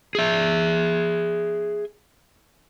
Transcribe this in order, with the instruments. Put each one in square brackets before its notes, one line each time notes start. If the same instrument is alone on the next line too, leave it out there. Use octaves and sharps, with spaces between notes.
[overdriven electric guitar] G#4 E5